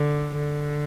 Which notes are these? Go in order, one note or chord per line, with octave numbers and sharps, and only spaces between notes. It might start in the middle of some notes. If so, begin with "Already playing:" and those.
Already playing: D3
D3